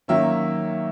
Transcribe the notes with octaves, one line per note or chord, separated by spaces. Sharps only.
D#3 F#3 A#3 C#4 E5